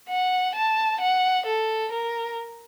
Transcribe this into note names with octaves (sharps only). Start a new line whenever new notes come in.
F#5
A5
F#5
A4
A#4